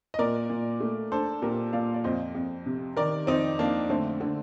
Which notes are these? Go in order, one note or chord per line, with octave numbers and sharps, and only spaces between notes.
D#5
A#2 A#4 D5
A#2
A3
D4 A4 C5
A#2 G4 A#4
A#2 D5 F5
D5
F2 C5 D#5
F2
C3
D#3 A#4 D5
F2 C4 D#4
F2 A#3 D4
D3 A3 C4
D3